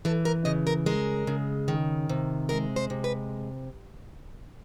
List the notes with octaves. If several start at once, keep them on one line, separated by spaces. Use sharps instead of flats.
E3 A4
A#4
C#3 D#5
A#4
G#3 A#4
C#3
D#3
C3
G#3 A#4
C5
C3
B4